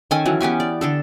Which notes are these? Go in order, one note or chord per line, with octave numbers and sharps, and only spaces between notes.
D#3 C#4 A4 G#5
E3 F#3
B3 C#4 G4 G#5
D5
D3 D4 A4